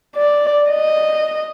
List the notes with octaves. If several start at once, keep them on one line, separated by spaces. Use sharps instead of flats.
D5
D#5